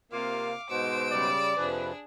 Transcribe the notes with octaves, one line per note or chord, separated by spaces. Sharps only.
C3 A#3 F4 F5 D6
G#2 B2 C5 E6 D7
C#3 G3 D5
F2 C3 F3 D4 G#4 B4